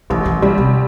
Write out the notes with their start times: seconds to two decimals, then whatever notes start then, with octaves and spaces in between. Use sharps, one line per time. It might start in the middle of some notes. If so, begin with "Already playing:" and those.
0.10 A1 E3
0.26 E3
0.42 D3 G3
0.58 C3